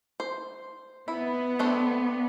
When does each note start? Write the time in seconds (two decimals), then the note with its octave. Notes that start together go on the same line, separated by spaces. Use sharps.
0.20 C5
1.08 B3 E4
1.59 A3 C4 D4